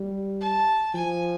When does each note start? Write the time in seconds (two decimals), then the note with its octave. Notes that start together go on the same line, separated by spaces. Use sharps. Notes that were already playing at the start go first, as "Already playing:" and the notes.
Already playing: G3
0.40 A5
0.94 F3 G#5